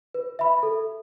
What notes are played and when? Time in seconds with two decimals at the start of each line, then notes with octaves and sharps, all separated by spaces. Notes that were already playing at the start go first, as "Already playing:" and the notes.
0.14 B4
0.39 E5 B5
0.63 A4